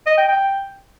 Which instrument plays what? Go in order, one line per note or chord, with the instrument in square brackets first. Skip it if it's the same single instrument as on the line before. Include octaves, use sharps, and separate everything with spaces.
[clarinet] D#5
G5
G5